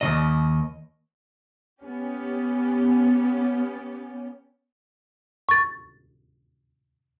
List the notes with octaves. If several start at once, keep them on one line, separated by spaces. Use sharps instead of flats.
D#2 B2 D#5
B3 C#4 G4
C#6 A6